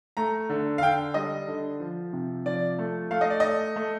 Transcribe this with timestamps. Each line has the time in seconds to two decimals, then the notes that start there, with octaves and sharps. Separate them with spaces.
0.17 A3 A#5
0.49 D3
0.78 F5
0.82 D3 G5
1.14 G3 D#5
1.48 D3
1.80 F3
2.13 C3
2.46 F3 D5
2.79 A3
3.11 A3 F5
3.21 D#5
3.30 D5
3.40 A3 D#5
3.76 A3